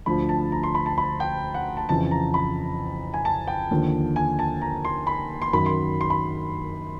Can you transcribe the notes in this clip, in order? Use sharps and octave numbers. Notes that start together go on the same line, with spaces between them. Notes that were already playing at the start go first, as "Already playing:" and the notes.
D2 D3 F3 B5
A5
A#5
C6
B5
A5
B5
G5
F#5
A5
F2 C#3 E3 A5
A#5
B5
G#5
A5
G5
D#2 D3 F3
G#5
A5
A#5
C6
B5
C6
F#2 D#3 F#3 B5
C6
C6
B5